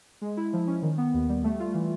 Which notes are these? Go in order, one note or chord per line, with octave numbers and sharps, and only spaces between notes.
G#3
E4
F3
C#4
D#3
B3
D#2
G3
A3
F4
E3